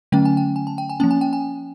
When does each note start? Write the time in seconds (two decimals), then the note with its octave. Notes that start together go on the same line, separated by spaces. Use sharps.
0.12 D3 F#3 A3 C#4 G5
0.25 G#5
0.37 G5
0.56 G#5
0.67 A5
0.78 G5
0.90 G#5
1.00 F3 A#3 C#4 A5
1.11 G#5
1.21 G5
1.33 G#5